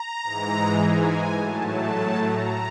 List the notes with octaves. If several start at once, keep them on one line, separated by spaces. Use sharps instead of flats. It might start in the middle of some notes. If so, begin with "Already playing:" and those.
Already playing: A#5
G#2 E3 G#3
G#5
A2 F#3 A3 A5
A5
A#5